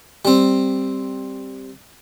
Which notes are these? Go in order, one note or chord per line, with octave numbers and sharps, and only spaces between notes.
G3 C4